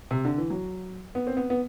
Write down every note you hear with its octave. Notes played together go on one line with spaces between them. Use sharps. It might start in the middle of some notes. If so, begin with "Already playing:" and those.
C3
D3
E3
F#3
B3
C4
B3
B3